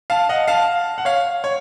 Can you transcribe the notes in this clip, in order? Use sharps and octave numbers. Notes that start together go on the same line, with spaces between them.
F5 A5
D#5 F#5
F5 A5
F#5
C#5 F5
C#5